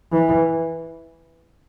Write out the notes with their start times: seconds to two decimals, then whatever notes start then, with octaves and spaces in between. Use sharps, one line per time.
0.12 E3